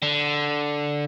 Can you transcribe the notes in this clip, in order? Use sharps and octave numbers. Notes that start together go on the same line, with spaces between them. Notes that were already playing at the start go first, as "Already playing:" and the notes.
D3